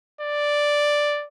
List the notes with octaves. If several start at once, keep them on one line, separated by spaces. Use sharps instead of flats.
D5